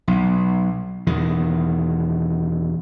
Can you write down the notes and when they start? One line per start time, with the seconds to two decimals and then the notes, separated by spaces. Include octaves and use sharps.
0.08 B1
1.07 E2 B2 D#3